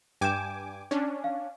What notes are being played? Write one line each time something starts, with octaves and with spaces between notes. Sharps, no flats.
G2 G5 G#5 D6 G6 E7
C#4 D4
F5